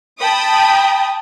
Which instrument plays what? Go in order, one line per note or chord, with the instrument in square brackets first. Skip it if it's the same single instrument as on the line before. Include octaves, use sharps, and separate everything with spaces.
[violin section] G5 A5 B5 D#6